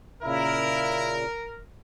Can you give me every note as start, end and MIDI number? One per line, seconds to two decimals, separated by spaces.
0.23 1.25 46
0.23 1.25 49
0.23 1.18 64
0.23 1.59 70